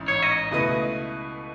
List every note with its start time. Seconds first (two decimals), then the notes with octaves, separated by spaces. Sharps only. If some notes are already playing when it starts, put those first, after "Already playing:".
Already playing: A1 G#2 C#4 E4
0.08 C#5
0.23 D#5
0.51 C#2 B2 A3 E4 B4